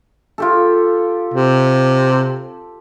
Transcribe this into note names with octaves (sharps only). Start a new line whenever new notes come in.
F4 G4 A4
C3